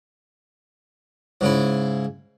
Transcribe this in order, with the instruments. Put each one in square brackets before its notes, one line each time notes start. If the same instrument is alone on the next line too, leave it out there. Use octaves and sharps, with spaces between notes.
[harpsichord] G#2 C#3 E4